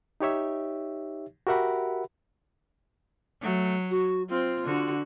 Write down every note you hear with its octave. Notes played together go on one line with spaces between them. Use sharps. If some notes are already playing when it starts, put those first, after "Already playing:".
D#4 G4 C#5 E5
F#4 G4 A#4 E5 F#5 B5
F#3 A3
F#4
C4 F4
D3 F#4